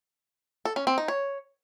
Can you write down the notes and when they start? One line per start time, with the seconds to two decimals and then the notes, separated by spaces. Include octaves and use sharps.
0.65 A4
0.76 C#4
0.87 C4
0.98 D#4
1.08 C#5